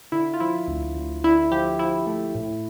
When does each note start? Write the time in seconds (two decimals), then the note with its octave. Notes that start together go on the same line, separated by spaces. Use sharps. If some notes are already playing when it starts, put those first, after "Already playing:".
0.12 D3 E4
0.34 F4
0.40 F3 E4
0.68 D2
0.95 D2
1.24 D3 E4
1.51 F3 G4
1.79 F3 E4
2.07 A3
2.35 A2